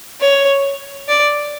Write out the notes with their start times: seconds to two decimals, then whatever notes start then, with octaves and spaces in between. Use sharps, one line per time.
0.20 C#5
1.08 D5